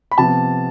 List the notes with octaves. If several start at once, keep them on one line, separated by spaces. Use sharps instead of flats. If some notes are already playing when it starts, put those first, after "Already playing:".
B5
C3 F3 B3 A5